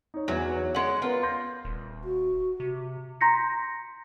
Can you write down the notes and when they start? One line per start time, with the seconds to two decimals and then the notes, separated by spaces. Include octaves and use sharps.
0.14 D#4 C#5
0.28 E2 E3 F#3
0.75 G#3 C#4 F#5
1.02 B3 F4 A#4 B4
1.23 C6 G6 A#6
1.65 D#1
2.04 F#4
2.60 C3
3.21 A#5 C6 G6 A#6 B6 C#7